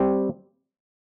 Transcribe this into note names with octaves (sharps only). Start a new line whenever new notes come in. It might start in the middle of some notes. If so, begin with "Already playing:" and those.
Already playing: G3 C4 G4